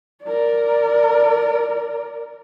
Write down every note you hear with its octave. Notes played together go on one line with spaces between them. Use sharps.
A#4 D5